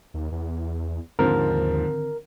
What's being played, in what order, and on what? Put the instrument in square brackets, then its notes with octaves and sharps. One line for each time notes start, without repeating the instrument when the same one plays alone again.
[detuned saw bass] D#2
E2
[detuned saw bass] D#2 [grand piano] G#2 F3 [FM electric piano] D3 D#3 C4 [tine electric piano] A#4